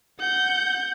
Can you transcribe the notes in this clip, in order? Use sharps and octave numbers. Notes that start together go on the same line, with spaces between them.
F#5 G6